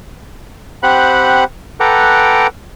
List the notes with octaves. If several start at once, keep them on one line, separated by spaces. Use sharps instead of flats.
C4 G4 C5 F#5 B5 F#6
A4 B4 F#5 G5 A#5 D6